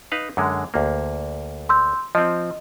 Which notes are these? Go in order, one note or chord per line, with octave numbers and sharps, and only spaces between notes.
D#4 B4 F5
F#2 D3 G#3
D2 A#3
C6 E6 G6
F3 C4 D#5